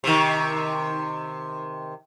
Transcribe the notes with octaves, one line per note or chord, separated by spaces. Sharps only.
C3 D#3